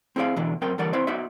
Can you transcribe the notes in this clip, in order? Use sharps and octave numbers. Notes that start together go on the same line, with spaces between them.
C4 E4 G#4 D5 F5
B2 D3 E3 D4
F#2 C4 A#4 G5
D3 E3 G3 A#4 D5 F#5
C4 E4 B4 C5 D5
B3 D#4 F#4 D5 E5